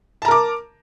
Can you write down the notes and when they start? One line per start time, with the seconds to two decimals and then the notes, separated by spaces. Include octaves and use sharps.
0.22 A5
0.25 A#5
0.28 A#4
0.31 D6